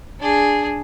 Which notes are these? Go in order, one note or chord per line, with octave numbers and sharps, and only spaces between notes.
D4 G#4